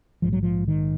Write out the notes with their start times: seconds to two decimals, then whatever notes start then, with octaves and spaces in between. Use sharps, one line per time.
0.22 A#1 G#2 F3
0.33 F#3
0.43 F3
0.68 D#3